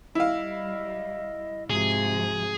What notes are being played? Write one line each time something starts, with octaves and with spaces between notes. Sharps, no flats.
G3 E4 D#5 F5
G#2 C3 F3 F#4 G#4